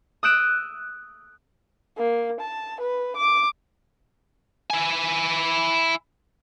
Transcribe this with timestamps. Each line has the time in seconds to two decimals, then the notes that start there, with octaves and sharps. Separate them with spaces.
0.23 D#6 E6 F#6 G6 D7 E7
1.97 A#3
2.40 A5
2.80 B4
3.16 D6
4.70 E4 G#5